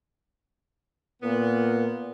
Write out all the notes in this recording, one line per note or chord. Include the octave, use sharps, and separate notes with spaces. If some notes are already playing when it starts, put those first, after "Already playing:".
A#2 B3